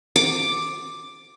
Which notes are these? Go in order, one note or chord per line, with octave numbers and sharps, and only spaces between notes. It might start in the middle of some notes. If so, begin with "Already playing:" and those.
D6